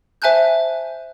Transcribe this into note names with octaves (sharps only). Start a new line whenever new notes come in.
C5 E5 G#5 A5 F#6 G6